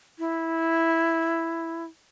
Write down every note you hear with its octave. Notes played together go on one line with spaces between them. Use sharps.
E4